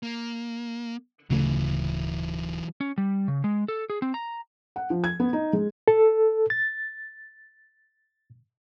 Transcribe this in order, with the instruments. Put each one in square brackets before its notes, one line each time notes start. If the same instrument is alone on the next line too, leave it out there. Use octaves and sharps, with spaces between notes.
[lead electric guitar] A#3
[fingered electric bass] D1 C#3 A3 [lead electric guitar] E3 F#3
[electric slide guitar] C#4
G3
C#3
G#3
A4
G#4
C4
A#5
[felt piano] F#5
F3
G#6
B3
D#4
G#3
[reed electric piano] A4
A6